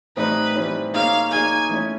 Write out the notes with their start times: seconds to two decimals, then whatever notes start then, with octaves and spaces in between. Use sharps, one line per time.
0.16 A2 E3 G3 C4 D#4 B4
0.56 A2 E3 G3 C4 D#4
0.94 A#3 D#4 G#4 C#5 F5
1.32 A#3 D#4 G#4 C#5 G#5
1.69 E3 A3 C#4